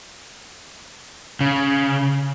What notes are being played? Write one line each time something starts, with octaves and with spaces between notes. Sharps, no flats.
C#3